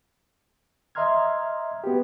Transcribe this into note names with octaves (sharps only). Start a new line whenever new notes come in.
D#5 E5 A#5 C6 F6 G#6
B3 F#4 G4